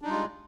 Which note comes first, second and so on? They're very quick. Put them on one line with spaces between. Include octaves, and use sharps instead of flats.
D4 D#4 G3 F4 G#3